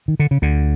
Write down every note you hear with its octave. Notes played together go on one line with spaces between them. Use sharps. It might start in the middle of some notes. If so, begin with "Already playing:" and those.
D#3
D3
C#3
D2 D3